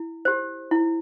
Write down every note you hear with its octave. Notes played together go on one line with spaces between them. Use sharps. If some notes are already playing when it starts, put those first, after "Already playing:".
Already playing: E4
G4 C5
E4